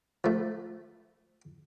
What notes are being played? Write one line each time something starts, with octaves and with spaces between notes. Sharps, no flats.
F3 A3